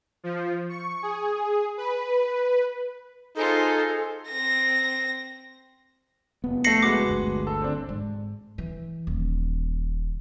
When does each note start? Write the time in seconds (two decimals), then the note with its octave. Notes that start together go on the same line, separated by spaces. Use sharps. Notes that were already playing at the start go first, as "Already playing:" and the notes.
0.24 F3
0.69 C#6
1.02 G#4
1.77 B4
3.36 D#4 F4 G#4 A4 C5
4.29 C4 A#6
6.44 F1 B3
6.64 A3 A#6 C7 C#7 F#7
6.83 G#3 F#4 B4 D6
7.08 G1 D2
7.47 A4
7.62 C4 D4
7.89 G#2
8.58 E3
9.07 D#1